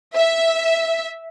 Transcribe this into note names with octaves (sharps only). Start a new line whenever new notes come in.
E5